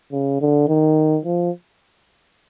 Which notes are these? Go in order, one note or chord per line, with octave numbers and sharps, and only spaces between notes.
C#3
D3
D#3
F3